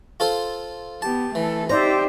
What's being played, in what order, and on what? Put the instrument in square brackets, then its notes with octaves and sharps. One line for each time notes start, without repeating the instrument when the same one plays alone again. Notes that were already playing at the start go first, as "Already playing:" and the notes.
[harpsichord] F4 A4 C5
[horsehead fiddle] B3 G4 [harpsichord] A5
[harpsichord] E3 [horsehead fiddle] A3 A4
[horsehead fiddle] D#4 G4 [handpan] C5 D5 E5 [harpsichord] A#5